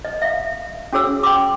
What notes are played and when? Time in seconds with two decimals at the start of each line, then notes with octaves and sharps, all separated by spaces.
0.05 D#5
0.22 E5 F5
0.93 C#4 F#4 G#4 C#5 E6
1.23 G5 C6 D6